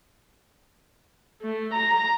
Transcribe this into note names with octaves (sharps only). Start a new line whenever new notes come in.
A3
A#5